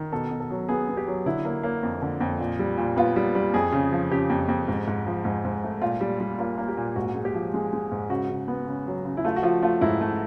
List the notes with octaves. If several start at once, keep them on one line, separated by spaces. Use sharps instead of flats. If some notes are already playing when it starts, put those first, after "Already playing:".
Already playing: D#3
B2 A4
B2
A4
F#3
B3 G#4
B3
G4
F#3
D3 E4
A#3
A#3
F2
D3
F2
A#2
G3
A#2
B3 F4
G3
G3
F2 G#4
C#3
F3
C#3 G4
F2
F2
G#2
G#2
F3
G#2
G#2
A3
A#2 F4
G3
G3
A#3 F4
A#3
G4
A#2
G#2 F#4
G#3
G4
F3
G#3
G#3
G#2
C#3 F#4
C#3
B3
C#3
F#3
C#3
E4
A3 F4
F#4
F3 F4
A3 F4
G#2 E4
A3